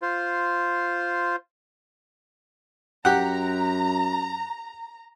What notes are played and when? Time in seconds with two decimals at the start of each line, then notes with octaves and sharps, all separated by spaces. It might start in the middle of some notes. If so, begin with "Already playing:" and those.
0.02 F4 C5
3.05 F#2 G4 F#5 A#5